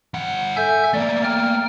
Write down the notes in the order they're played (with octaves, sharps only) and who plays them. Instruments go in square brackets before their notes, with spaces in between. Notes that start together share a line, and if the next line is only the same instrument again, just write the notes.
[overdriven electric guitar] G2 F#5
[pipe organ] A4 E5 G6 [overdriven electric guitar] G#5
[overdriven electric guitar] A3 A#3 [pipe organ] D5
[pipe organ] G5 F6